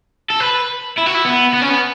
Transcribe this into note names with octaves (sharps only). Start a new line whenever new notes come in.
A4
B4
E4
F#4
E4
B3
B3
C#4
B3